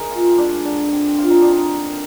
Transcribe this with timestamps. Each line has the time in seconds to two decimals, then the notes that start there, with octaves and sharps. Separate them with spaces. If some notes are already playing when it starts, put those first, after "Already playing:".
Already playing: D#4 G#4 A#4
0.10 C4 F4
0.38 G#3 D4
0.64 D3 D4
0.92 C4
1.18 C4 F4
1.30 D#4
1.42 D3 D4
1.52 D#4
1.73 A#3